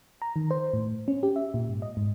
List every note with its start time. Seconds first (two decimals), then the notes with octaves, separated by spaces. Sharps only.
0.22 A#5
0.36 D#3
0.51 C5
0.73 A2
1.08 C#4
1.23 G4
1.36 E5
1.54 A#2
1.69 G#2
1.82 D#5
1.97 G#2